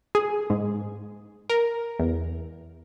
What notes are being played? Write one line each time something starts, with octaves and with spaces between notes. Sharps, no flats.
G#4
G#2
A#4
E2